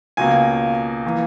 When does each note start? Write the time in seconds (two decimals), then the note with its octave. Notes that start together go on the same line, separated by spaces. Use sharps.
0.17 C#2 B2 A#3 G#5
1.06 E3 A#3